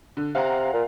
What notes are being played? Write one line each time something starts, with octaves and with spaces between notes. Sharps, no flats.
D3
C3 F5 F#5 A#5
A#2